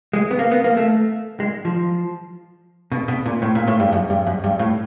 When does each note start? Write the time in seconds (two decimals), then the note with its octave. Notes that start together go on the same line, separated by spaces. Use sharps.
0.13 G#3
0.31 B3
0.39 A#3
0.51 B3
0.64 A#3
0.77 A3
1.40 G#3
1.65 F3
2.92 B2
3.08 B2
3.26 A#2
3.42 A2
3.55 A#2
3.68 A2
3.80 G2
3.92 F#2
4.10 G2
4.27 F#2
4.44 G2
4.59 A2